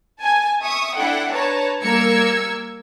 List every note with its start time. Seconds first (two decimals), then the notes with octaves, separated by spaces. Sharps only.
0.18 G#5 A5
0.62 E5 C#6 D#6
0.96 D4 E4 A4 F#5 G5
1.33 B4 C#5 A5 A#5
1.82 G3 A#3 A#4 E6 G#6 C#7